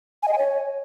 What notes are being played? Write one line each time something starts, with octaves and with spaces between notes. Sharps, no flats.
G#5
D#5
G#5
C#5